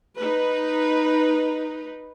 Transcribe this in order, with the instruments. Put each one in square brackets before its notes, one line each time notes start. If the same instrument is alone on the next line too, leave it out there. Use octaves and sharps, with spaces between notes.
[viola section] D#4 B4